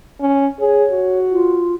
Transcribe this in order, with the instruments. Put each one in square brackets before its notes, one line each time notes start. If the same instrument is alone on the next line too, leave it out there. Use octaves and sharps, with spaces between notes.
[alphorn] C#4
[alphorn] G#4 [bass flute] C#5
[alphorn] F#4
[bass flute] F4